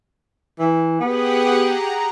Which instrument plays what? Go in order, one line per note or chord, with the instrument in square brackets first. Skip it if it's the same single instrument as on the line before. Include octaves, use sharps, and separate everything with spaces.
[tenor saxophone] E3
[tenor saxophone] B3 [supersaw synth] G4 G#4 F#5
[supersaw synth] A#5